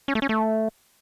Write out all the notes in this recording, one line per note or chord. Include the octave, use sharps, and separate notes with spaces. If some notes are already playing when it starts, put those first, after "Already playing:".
C#4
A3
C#4
A3